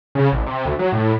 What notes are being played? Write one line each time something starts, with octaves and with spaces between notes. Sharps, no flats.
C#3
A1
C3
D2
F#3
A2